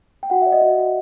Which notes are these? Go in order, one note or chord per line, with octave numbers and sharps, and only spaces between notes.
G5
F#4 F#5
D5 E5
D#5
F#4
F#4